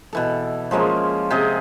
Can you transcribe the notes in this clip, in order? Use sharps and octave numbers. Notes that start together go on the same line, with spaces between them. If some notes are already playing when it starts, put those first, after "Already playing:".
B2 E3 A4
F3 G#3 A#3 C#4
C3 G#4 D#5